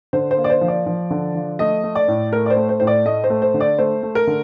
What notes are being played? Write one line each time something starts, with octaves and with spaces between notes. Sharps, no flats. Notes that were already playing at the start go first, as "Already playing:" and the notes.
D3 C5
C5
A#3
D5
C5
F3
D5
F3
D3
F3
A3 D#5
A3
D5
A2
A3 A#4
D5
C5
A3
C5
A2 C5
D5
A3 D#5
C5
A3
C5
D3
D5
A3 C5
A3
A#4
D3